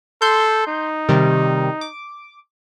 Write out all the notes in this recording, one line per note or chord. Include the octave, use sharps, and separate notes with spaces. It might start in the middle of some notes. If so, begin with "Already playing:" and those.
A4 C6 G6
D#4
C3 D#3 G3
D6